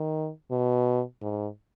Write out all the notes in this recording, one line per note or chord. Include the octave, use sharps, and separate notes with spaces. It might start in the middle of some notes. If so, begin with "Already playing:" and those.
Already playing: D#3
B2
G#2